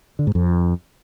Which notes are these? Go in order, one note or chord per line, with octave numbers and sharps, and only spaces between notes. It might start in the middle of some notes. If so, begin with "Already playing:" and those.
D3
G#2
F2